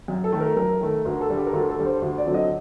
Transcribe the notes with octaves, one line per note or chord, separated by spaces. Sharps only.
F#2
A4
D#3 A3
A#4
F#2 A#4
D#3 A3
D2 A#4
A4
D3 G3
G4
A#4
D2 A4
A4
D3 G3
C5
D2
D5
D3 F#3 C4
D#5